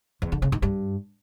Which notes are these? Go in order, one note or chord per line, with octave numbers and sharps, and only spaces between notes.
E2
D3
C#3
D#3
G2